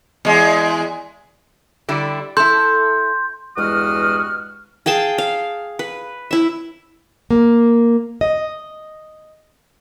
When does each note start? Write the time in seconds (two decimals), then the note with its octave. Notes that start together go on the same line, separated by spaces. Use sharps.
0.25 E2 G#3
1.89 D3 G3 E4
2.37 E4 A4 C6 G6
3.57 E2 G2 G#3 F#4 D#6 F6
4.86 G#4 F5 G5 A5
5.18 F5
5.79 B4
6.31 E4 E5
7.30 A#3
8.21 D#5